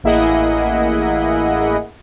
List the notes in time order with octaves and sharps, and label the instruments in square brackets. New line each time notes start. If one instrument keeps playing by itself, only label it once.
[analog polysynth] A1 A#3 E4 G#4 D#5 F#5